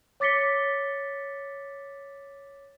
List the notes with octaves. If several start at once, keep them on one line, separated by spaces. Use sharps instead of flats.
C#5 D6 A6 B6 C#7 G7